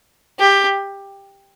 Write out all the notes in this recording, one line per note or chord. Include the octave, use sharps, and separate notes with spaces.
G4